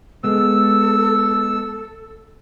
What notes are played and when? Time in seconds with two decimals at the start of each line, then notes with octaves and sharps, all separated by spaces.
0.24 G#3 B3 A4 E6